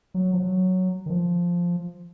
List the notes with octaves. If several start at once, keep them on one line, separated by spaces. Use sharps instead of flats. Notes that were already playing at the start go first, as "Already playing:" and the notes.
F#3
F3
F#3
D#3
F3